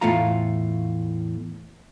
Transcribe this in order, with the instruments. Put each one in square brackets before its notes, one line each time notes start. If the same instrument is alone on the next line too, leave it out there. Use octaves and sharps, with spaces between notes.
[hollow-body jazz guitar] E2 A2 A3 F4 F5 A#5